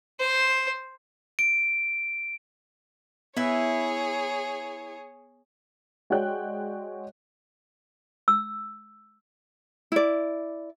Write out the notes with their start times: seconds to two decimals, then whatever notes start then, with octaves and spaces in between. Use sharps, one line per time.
0.20 C5
1.39 D7
3.37 B3 E4 G#4 B4 C#5 E5
6.10 G#3 F#4 C#5 D5 G5 F#6
8.28 E6
9.92 E4 D5